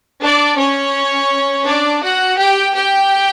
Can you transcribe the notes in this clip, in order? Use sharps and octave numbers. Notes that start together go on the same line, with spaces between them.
D4 D5
C#4 C#5
D4 D5
F#4 F#5
G4 G5
G4 G5